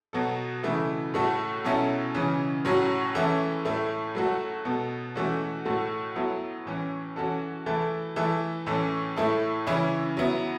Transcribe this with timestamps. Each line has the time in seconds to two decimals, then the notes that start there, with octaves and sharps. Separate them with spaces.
0.13 B2 F#3 B3 F#4 A4
0.63 C#3 E3 A3 E4
1.14 A2 A3 F#4 A4
1.64 B2 F#3 C#4 E4 A4
2.15 C#3 E3 C#4
2.65 A2 F#3 C#4 F#4
3.15 E3 A3 C#4 E4 A4
3.65 A2 A3 E4
4.15 F#3 A3 F#4 A4
4.65 B2 B3 A4
5.15 E3 A3 C#4 F#4
5.65 A2 A3 F#4 A4
6.15 F#3 B3 E4 A4
6.66 A2 E3 C#4
7.16 E3 C#4 F#4 A4
7.66 E3 A3 E4 A4
8.16 E3 A3 E4 A4
8.66 A2 E3 C#4 A4
9.16 A2 A3 E4 A4
9.67 C#3 E3 C#4 E4
10.17 F#3 B3 E4